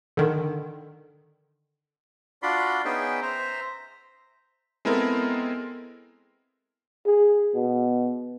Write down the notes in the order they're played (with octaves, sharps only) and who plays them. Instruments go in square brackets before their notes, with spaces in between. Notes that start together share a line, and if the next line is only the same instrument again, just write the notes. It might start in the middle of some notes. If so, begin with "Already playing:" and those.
[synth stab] D3 D#3
[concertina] D4 F4 F#4 D5 B5 C6
B3 C#4 D#4 G#4 E5 G5
C5 E5 A#5
[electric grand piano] G#3 B3 C4 E4 A4 A#4
[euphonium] G#4
B2